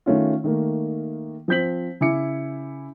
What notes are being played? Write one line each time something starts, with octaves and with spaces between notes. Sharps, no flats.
D#3 A3 C#4 F4
D#3 A3 A#3
F3 C4 G6 B6 F#7
C#3 E4 G#5 D6 C#7